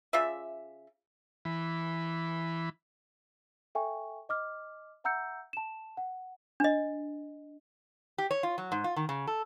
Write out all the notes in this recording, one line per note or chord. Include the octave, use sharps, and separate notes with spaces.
C#3 F4 D5 E5
E3 B5
A4 E5 G5 G#5 C#6
D#5 D6 F6
E5 F#5 A#5 E6 G6 C#7
A5 E7
F#5
D4 D#5
G4
C#5
F4
F#3
G#2
F4
D#3
C#3
A4